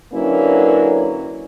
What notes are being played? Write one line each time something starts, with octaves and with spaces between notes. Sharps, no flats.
D3 F#3 A#3 C#4 E4 B4